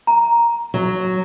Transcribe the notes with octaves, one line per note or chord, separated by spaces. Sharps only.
A#5
F#3